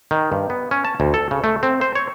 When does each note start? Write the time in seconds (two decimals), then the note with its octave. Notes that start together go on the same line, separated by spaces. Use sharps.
0.11 D#3
0.32 G2
0.50 B3
0.71 C#4
0.85 A5
1.00 D2
1.14 A4
1.31 C#3
1.44 A3
1.63 C4
1.81 C5
1.95 C#5